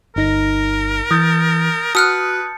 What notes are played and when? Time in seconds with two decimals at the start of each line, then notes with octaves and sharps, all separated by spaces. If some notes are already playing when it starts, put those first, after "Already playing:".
0.16 G1 D#4 A#4 A#6
1.11 E3 D#6 G6 A6
1.95 F#4 B4 A5 D#6 F6 F#6 C#7